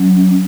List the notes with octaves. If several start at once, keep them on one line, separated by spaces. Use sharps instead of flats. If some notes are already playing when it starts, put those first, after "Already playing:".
Already playing: F#3 C#4